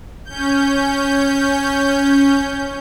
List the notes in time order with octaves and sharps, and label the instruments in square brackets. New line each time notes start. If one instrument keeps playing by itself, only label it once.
[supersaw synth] C#4 G6